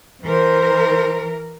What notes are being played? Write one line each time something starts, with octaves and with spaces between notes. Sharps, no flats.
E3 A#4 C5